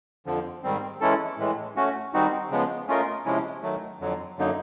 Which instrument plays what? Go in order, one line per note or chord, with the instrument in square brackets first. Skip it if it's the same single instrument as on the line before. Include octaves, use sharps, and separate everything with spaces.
[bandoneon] F2 D3 F3
G#2 D#3 G3 C4
E3 G#3 C#4 E4 A4
A2 E3 G#3
A3 C#4 F#4
D#3 G3 C4 D#4 F#4
C#3 F3 G#3 B3
A3 C#4 F4 A#4 D#5
C3 F3 G#3 C#4 E4
D#3 F#3 A3
F2 D3 F#3
F#2 D3 F#3 A#3 D#4